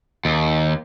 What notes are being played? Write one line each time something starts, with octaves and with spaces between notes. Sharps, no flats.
D#2